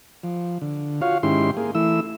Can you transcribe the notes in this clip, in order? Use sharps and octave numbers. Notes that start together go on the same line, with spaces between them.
F3
D3
F4 F#4 C#5 F5
G#2 D#3 C#4 E4 G4 C6
A#3 G#4
E3 A3 E4 E6